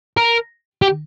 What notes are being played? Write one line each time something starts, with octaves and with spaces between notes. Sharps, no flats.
A#4
G4